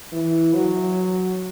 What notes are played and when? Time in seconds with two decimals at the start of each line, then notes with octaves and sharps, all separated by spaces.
0.13 E3
0.54 F#3